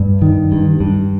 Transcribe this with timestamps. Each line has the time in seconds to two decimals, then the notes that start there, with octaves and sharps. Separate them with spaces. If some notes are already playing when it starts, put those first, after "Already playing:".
Already playing: G2
0.22 D#3
0.52 G2
0.80 G2